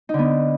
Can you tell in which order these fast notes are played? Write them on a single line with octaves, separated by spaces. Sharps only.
D#4 D3 B3